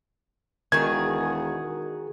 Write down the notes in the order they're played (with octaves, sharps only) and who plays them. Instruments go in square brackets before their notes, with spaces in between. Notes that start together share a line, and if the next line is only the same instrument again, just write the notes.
[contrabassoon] E1 [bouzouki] D#3 F#4 G#4 [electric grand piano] G#6